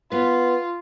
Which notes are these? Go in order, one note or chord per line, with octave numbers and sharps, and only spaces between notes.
B3 F4 B4